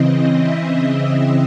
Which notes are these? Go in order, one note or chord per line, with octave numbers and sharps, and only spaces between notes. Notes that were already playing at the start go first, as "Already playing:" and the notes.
Already playing: C#3 E3 C4 D#5
E5